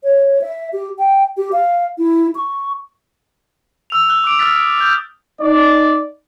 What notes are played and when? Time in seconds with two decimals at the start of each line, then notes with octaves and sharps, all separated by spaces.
0.03 C#5
0.41 E5
0.73 G4
0.99 G5
1.37 G4
1.52 F5
1.98 E4
2.35 C#6
3.90 E6 F7
4.09 E6 F#6 G7
4.24 D6 F#6 D7
4.39 D#6 F6 F#6 A6 B6
4.56 D7
4.78 F6 G6
5.41 D#4 D5